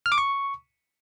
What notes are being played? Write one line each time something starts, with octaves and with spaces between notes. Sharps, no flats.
F6
D6
C#6